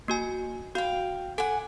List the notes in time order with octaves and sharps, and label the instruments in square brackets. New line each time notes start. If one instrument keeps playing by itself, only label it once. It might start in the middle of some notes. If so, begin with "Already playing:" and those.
[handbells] A#3 F#4 G#5
[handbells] F#4 [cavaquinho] F5 G5
[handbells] A4 [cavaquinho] F#5 G#5